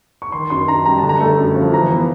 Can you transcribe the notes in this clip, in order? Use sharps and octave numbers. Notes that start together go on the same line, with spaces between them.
C#6
D#3 C6
F#2 C6
F#2 A#5
G3 A#5
A5
D3
A#5
A3
F#2
F3
E3 A#5
B3